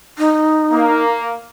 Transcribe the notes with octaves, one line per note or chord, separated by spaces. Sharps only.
D#4
A#3